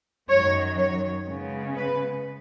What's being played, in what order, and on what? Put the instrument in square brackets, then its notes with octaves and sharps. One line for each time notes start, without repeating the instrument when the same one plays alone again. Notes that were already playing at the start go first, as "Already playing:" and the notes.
[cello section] F#2 D#3 F#3 C#5
C#5
C#3 G#3 B3
B4